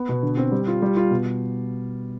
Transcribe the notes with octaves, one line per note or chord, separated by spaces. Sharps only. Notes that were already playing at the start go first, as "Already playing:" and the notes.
Already playing: B3
B2
D3
C4
G3
F4
G3
F4
B2